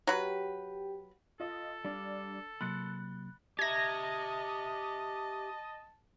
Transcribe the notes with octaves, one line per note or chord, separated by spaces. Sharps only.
F#3 G4 B4 G5
F4 A4 D#5
G3 D4 D5 F5
C3 F#3 A#3 B5 C6 F#6 A6 C#7
G4 D#5 E5 A5 G#6 A#6